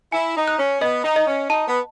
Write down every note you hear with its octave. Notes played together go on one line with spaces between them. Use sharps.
E4 G#5
D#4
F#6
C#4
B3 D#5
D#4
D#5
C#4
D#4 A5
B3